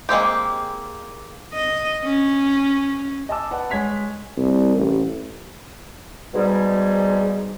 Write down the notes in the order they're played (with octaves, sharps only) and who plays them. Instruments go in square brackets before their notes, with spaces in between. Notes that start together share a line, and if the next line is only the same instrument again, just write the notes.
[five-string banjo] G#3 A#3 C4 G4
[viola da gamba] D#5
C#4
[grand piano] D#5 G#5 A5 D6 E6
B4 F#5 A5
G#3 C#5 G#6 B6 F7
[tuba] C2
A1
[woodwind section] G#2 B2 G3